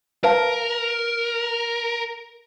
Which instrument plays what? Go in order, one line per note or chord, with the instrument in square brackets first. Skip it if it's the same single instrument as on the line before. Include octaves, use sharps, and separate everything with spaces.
[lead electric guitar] A#4 [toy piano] B4 F5 A5